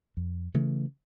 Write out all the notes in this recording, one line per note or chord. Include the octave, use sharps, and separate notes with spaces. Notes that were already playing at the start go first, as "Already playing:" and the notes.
F2
C#3 E3 A3